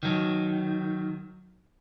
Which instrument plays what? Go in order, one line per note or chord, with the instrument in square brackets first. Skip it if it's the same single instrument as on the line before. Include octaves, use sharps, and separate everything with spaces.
[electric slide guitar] D#3 F#3